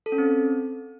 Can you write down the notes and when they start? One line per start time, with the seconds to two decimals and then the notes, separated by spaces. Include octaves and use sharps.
0.06 A4
0.12 C#4
0.18 C4